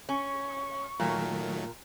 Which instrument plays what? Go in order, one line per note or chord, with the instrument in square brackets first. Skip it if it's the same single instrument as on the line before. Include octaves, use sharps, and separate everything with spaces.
[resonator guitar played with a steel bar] C#4 [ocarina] C#6
[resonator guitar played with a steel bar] A#2 [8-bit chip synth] D#3 F#3 A3